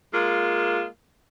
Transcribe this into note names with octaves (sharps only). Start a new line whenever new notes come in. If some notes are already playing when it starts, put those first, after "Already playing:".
G#3 A#3 F4